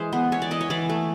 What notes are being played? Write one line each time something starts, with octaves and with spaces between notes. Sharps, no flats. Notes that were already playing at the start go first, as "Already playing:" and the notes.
Already playing: E3 G#3 C5
B3
E3 C#5
D5
E3 D#5
C#5
E3 D5
A3